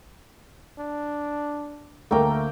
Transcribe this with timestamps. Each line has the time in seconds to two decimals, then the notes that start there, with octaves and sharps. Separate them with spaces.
0.78 D4
2.11 D2 A3 A#3 A#4 G5